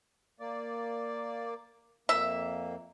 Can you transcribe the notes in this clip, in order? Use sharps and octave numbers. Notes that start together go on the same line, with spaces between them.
A#3 D5
F2 A#3 E5